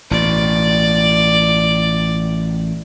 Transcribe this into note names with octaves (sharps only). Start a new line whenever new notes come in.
A1 B2 D5